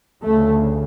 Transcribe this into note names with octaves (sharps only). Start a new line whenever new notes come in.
D2 C#3 A3